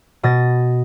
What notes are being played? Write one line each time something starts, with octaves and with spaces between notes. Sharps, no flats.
B2 D#5 A6